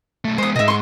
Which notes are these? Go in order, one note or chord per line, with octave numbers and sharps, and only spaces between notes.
B1 A3
G#3 B3 C5 D#6
G#2 B2 D#5 E5
C6 C#6